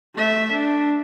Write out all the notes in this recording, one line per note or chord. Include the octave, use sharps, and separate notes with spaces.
A3 E5
D4